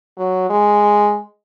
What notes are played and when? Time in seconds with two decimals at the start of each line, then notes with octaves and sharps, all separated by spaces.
0.17 F#3
0.50 G#3